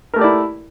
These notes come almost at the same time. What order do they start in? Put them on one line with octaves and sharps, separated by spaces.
A#4 A3 G4 D5 E4